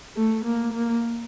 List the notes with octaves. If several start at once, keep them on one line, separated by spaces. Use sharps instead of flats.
A3
A#3
A#3